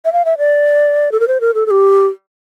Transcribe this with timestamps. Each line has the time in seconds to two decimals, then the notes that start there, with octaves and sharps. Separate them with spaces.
0.05 E5
0.13 F5
0.25 E5
0.38 D5
1.12 A4
1.20 A#4
1.28 C5
1.41 A#4
1.54 A4
1.66 A4
1.71 G4